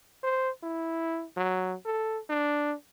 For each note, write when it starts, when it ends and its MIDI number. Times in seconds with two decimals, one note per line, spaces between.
0.23 0.50 72
0.63 1.25 64
1.36 1.75 54
1.85 2.19 69
2.29 2.74 62